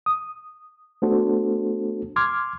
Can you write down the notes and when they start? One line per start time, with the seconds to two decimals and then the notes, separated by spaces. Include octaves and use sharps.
0.06 D#6
1.02 A3 B3 D4 F#4 A4 C5
2.16 C6 D6 F6 G#6